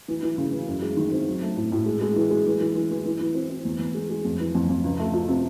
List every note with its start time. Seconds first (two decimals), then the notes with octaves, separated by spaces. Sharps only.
0.08 E3
0.23 E3
0.38 C#3
0.52 E3
0.68 F#2
0.82 G#3
0.97 D#3
1.12 C4
1.27 F#3
1.42 A3
1.57 A2
1.72 A2
1.86 G#3
2.01 G#3
2.16 E3
2.31 G#3
2.46 E3
2.61 E3
2.75 E3
2.91 E3
3.06 E3
3.21 E3
3.35 C4
3.50 C4
3.65 E2
3.79 E2
3.95 G#3
4.10 G#3
4.25 F2
4.39 E3
4.55 F2
4.69 F2
4.84 C#2
4.99 A3
5.14 F3
5.28 C3